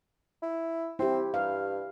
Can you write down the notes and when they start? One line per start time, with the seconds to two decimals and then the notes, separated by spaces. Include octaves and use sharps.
0.42 E4
0.99 C4 E4 G4
1.34 G2 F5